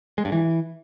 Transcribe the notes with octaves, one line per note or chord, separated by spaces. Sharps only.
G#3
G2
E3